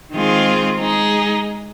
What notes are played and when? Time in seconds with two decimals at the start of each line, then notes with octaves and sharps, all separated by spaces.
0.13 D#3 G#3 C4 F4 G#4
0.79 G#3 D#4 G#4